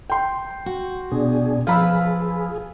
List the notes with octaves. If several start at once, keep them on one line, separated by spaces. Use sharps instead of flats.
G5 C6
F#4
B2 D4 G#4
F3 F4 G#4 B4 F5 B5 E6